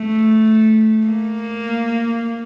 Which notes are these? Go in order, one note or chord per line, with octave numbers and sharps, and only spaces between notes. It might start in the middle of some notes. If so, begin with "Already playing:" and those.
Already playing: A3
A#3